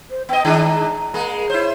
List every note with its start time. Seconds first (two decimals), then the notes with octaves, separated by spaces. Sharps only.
0.11 C5
0.29 B3 D#5 G5
0.45 D#3 G#3 D4 A#5
1.14 G#3 A#3
1.50 E4 C5 C#5